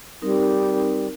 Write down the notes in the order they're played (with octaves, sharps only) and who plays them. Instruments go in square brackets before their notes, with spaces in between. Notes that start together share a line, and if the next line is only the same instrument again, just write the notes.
[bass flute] G3 [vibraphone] C4 D#4 A#4